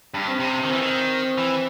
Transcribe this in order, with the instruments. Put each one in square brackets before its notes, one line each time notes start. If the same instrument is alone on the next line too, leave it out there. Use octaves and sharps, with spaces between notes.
[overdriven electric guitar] G2
[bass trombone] C4
[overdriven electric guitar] C3
[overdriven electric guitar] D#3 [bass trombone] C4
[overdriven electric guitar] E3
D#3
E3